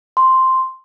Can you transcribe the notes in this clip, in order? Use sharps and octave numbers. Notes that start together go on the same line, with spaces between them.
C6